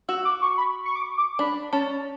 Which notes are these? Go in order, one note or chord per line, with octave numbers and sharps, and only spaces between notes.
F#4 E6
D6
C#6
B5
C#6
D6
D6
D4 B5
C#4 A5